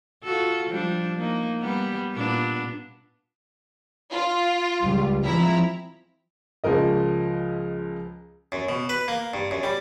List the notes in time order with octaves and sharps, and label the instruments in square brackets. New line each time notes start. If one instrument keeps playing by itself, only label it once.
[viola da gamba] F4 F#4 A4
F3 G3 D4
A#3 D#4
G3 B3
A#2 B3 D4
[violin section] F4
[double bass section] C#2 G3
[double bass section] F3 G#3 C4 [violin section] E4 A#5
[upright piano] C#2 F3 G#4 A#4 D#5
[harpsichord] F#2
B2
B4
A#3
G2
F#2
G3